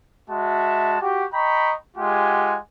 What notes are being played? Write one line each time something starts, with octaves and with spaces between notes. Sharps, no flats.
G#3 F#4 E5 A5
F#4 G4
D#5 G5 A#5 B5 C#6
G#3 F4 G4 F#5 G#5